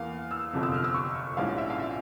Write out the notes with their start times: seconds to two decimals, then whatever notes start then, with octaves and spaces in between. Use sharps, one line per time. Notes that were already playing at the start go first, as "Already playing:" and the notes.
Already playing: E2 E3 A#3 F5
0.31 E6
0.53 G1 F2 C3
0.63 E6
0.74 F6
0.84 E6
0.94 C#6
1.37 A#1 G#2 G3 C#4 E4 F5
1.58 E5
1.70 F5
1.80 E5